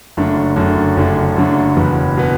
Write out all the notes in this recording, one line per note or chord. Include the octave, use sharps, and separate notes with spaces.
F#1 F#2 D3 A3 D4
F#1 F#2 D3 A3 D4
F#1 F#2 D3 A3 D4
F#1 F#2 D3 A3 D4
F#1 E2 B2 B3
B2 B3